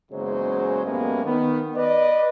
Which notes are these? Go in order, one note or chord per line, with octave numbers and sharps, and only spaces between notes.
F#1 E2 C#3 F#3 G#3 C5
F#2 A2 G3 G#3 A#3 B3
D#3 B3
B4 D5 D#5